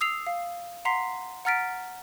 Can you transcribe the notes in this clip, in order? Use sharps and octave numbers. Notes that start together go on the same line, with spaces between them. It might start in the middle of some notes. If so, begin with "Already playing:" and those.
D#6 E6 C7 F7
F5
F#5 A#5 C6 B6 C7
F#5 A#5 F6 A6 B6 D7